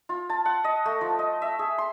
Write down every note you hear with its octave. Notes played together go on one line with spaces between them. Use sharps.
F4
A5
F#5
D#5
A3
F3
D#5
E5
G#4
C6